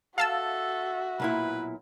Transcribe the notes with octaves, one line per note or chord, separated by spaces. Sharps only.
F#4 A4 E5 F5 A5 E6
B1 A#2 E4 B4